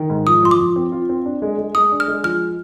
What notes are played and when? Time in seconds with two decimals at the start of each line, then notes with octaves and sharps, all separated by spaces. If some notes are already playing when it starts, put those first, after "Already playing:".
Already playing: D#3
0.10 G#2
0.27 F3 D#6
0.43 F3 C6
0.51 D6
0.60 F3
0.76 C4
0.92 F4
1.09 C4
1.26 D4
1.42 G#3
1.58 G#3
1.75 G#3 D#6
1.92 D4
2.00 F6
2.08 G#3
2.24 F3 F6